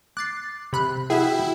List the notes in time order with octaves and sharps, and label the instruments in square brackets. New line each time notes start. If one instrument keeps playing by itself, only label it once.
[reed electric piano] D6 [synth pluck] F#6 A6 C7
[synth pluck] C3 B5 F#6
[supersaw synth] E4 [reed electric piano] F#4 F#5 G5 [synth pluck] G#4 E5